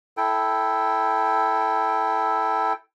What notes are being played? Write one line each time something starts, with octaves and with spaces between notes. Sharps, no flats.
E4 A4 G5